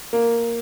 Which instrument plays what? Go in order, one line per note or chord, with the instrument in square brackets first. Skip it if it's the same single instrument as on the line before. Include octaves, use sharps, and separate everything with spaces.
[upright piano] A#3